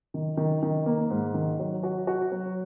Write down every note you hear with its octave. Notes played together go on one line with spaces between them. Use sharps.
D#3
D#3
D#3
A#3
G#2
D#3
F#3
F#4
F#4
F#3